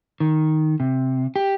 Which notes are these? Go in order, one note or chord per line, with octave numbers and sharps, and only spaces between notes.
D#3
C3
G4